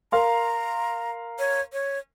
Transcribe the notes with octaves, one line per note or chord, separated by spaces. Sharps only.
A#4 F5 A#5 C6
C#5
C#5